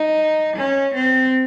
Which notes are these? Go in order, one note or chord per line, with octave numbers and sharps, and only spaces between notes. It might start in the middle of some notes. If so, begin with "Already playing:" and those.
Already playing: D#4
C#4
C4